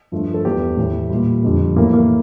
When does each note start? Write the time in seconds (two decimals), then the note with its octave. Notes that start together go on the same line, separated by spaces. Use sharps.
0.12 G2 F3 A3
0.34 A4
0.45 E2 E3 A3 G4
0.77 A2 E3 A3
1.10 A#2 G3
1.43 F2 D3 G3
1.76 A2 E3 A3 A#3
1.94 A#3